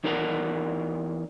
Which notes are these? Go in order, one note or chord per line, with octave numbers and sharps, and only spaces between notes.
E2 D#4 A#4 D5 F#5 A#5